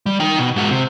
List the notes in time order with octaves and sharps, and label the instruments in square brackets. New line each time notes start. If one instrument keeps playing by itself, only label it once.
[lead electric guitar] G3
D#4 G5
B2
G#2 F#4
C3